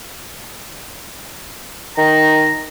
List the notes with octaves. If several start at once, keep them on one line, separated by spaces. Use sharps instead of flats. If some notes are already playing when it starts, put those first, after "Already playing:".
D#3 A#5